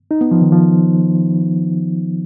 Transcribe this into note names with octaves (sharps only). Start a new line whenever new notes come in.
D#4
B3
F3
D#3
F3